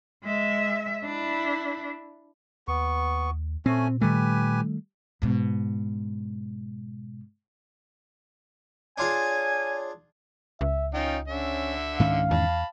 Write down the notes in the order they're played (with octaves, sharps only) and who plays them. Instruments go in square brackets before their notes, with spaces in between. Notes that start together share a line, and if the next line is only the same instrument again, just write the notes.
[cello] G#3 E5
D4 E4
[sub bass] D#2 [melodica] B3 C#6
[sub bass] A#2 [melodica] A3 C#4 G#5 [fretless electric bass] C4
[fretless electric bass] D#3 G3 A3 [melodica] G4 B4 G#5
[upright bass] G#2 B2
[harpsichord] D4 F4 G#4 [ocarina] C#5 [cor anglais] G#5
[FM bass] C#2 [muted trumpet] E5
[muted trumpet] C#4 [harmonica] D#4 F4 G5
[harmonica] D3 E5 [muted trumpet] C#4
[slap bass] G#2 D#3 C#4 [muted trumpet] F5
[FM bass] E2 [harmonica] A5 B5